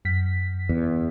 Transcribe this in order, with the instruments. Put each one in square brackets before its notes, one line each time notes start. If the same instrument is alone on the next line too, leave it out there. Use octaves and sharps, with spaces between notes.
[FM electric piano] F#2 B6
[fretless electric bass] E2